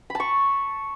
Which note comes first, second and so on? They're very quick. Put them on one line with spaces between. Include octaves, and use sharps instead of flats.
B5 A5 C#6